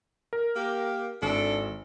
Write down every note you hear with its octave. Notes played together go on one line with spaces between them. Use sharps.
A#4
A#3 G4
G#1 D4 E4 A4